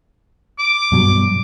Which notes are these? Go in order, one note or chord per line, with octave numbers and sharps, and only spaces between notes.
D6
G2 B2 F#3